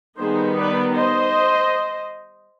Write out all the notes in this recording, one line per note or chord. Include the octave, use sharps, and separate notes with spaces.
D#3 G3 B3 D#4 G#4 C5
B4 D5
C5 D#5